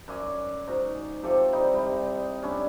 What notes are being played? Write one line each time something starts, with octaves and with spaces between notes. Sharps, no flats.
F#2 D5 G#5
G#2 F#4 A#5
C3 F3 G4 A4
C3 G3 D#4 E4
G3
G3 C#4 D4 E4